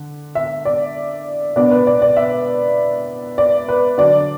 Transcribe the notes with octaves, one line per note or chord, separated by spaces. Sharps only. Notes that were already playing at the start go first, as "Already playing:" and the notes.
Already playing: D3
E5
D5
B2 B3 D4 D5
B4
D5
D5
E5
D5
B4
D3 F#3 D4 D5